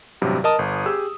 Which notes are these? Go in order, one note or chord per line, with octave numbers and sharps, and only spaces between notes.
A1 G2 C3 F#3
A#4 D#5 A5 D#6
G1
G4 G#4 E6